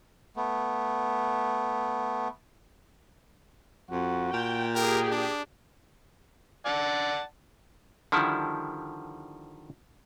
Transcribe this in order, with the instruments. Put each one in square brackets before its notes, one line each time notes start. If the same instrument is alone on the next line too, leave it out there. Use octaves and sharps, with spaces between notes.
[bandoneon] A3 B3
[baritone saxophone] F2 [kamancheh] F#4
[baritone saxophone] A#2 [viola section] G5
[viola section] G4 G#4 [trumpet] A#4 [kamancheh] G5
[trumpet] D4
[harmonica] D5 F#5 A5
[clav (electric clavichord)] D3 D#3 F3 G3 E4